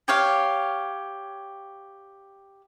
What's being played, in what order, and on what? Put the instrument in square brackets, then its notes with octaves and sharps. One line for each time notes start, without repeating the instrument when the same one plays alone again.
[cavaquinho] G4 C#5 F5